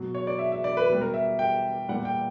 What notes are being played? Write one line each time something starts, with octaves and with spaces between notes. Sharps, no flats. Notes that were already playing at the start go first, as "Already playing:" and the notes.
Already playing: B2 F#3
C#5
D5
E5
E5
D5
B4
B2 G3
A#4
E5
G5
A#2 G3 F#5
G5